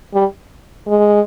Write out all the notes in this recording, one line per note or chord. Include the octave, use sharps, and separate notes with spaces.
G3
G#3